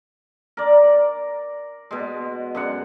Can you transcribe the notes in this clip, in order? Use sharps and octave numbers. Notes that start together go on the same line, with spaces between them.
A#4 D5
B2 G#3
F#2 G#3 F#5